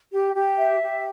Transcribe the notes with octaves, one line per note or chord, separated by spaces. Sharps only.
G4
G4
E5
G4